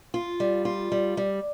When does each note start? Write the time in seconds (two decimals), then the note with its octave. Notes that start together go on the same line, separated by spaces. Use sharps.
0.14 F4
0.40 G3
0.65 F4
0.92 G3
1.17 G3